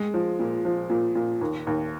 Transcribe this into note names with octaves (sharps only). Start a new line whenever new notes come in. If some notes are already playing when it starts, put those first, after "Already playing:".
Already playing: G#3
F3
A#2
F3
A#2
A#2
D#2
D#2